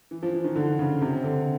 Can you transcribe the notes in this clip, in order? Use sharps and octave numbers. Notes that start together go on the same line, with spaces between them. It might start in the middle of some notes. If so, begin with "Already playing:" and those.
E3
F3
E3
D#3
D3
C#3
C3
D3